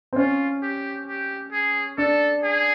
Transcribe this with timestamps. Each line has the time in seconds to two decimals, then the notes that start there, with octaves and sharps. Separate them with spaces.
0.13 C4
0.16 C#4 F4
0.62 G4
1.07 G4
1.52 G#4
1.98 D4 A4
2.43 G#4